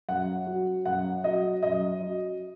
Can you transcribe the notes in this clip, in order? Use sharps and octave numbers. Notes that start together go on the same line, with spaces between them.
F#2 F#5
F#3
F#2 F#5
F#3 D#5
F#2 D#5
F#3